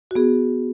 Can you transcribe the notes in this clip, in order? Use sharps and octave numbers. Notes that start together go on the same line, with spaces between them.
F#4
B3 G#4